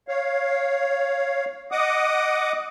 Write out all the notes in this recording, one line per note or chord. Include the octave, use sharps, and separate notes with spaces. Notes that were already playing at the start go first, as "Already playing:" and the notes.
C#5 F5
D#5 F#5 D6 D#6